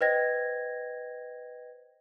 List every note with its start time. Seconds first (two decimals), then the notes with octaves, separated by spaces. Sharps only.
0.01 B4 C5 D#5 G5 G#6 A#6